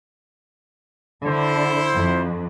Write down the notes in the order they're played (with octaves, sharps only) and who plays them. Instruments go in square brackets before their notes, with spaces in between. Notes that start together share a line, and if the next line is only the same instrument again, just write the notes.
[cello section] D3 [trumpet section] E4 C5
[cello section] F2